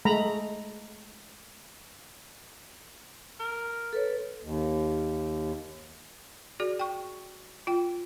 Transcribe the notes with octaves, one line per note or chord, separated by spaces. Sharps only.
G#3 A3 A#5 B5
A#4
A4 B4 C#5
D#2
F#4 G#4 D5
G5 C#6
F4 G5